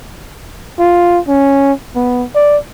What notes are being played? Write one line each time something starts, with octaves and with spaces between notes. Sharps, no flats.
F4
C#4
B3
D5